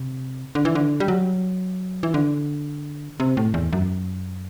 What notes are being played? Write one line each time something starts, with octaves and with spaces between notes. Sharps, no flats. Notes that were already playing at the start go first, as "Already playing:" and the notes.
Already playing: C3
D3
E3
D3
G3
F#3
E3
D3
C3
A2
E2
F#2